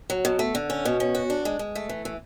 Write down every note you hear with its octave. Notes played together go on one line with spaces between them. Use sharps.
F#3
B2
A3
D3
C#4
B2
C#4
F#4
D4
G#3
G#3
A3
E3
E3